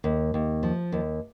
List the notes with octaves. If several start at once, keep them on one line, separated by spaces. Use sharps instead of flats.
D#2
D#2
F3
D#2